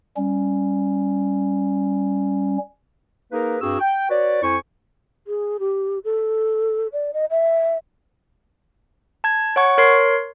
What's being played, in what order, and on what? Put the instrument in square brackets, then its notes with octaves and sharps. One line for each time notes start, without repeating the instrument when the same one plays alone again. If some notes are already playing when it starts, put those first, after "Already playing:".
[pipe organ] G3 C#4
[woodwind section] A#3 D#4 G#4 A#4 B4
G2 C4 D4 F#4 G#4 E6
G5
F#4 B4 C#5 D5
F2 E4 C5 G#5 C#6
[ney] G#4
G4
A4
D5
D#5
E5
[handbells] A5 G#6
C#5 F#5 C#6
A#4 C#5 C6 C7